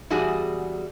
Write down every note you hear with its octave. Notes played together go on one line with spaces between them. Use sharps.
E2 G3 F#4 G#4